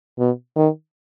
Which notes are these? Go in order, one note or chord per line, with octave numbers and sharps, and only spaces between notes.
B2
D#3